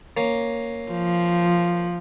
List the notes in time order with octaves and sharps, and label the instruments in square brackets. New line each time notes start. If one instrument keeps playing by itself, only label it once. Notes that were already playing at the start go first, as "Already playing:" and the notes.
[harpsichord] A#3 C#4
[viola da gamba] F3